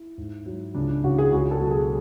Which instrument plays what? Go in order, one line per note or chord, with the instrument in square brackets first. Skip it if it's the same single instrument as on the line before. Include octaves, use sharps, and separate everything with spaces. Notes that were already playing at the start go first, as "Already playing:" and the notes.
Already playing: [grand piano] E4
G#2
F#3
C#2 D4
D4
C#3 E3 F#4
G#4
C#2 F#4
A4
B2 F#3
G#4